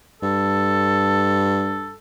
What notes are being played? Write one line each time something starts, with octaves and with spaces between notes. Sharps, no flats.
G2 A4